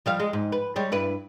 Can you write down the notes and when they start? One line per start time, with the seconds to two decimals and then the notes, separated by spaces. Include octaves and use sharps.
0.06 F3 G3 F5
0.20 G#3
0.33 G#2
0.52 B4
0.76 G3 G#3 C#5
0.92 G2 E4 B4